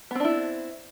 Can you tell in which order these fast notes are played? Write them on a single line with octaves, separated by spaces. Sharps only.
B3 C4 D4 E4